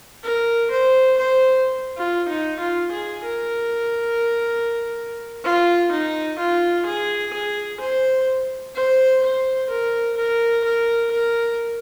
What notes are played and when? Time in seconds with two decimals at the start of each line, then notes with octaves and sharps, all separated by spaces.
0.24 A#4
0.71 C5
1.18 C5
1.98 F4
2.28 D#4
2.60 F4
2.92 G#4
3.23 A#4
5.44 F4
5.92 D#4
6.39 F4
6.86 G#4
7.33 G#4
7.80 C5
8.76 C5
9.23 C5
9.70 A#4
10.17 A#4
10.65 A#4
11.11 A#4